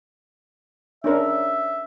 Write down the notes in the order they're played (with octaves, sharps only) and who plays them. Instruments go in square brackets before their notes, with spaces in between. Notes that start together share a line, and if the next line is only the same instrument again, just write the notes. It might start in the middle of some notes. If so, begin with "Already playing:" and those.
[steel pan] C#4 D4 A#4 [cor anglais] E5